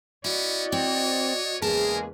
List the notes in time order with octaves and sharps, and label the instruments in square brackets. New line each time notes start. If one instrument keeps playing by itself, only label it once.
[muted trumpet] C#4 [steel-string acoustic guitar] E4 [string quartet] F#4 D5 D#5
[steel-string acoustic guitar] C4 [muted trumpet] C#5
[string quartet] E2 C#3 B4 [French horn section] G#3 A#3 G#4 [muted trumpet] A#4 [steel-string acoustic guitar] A5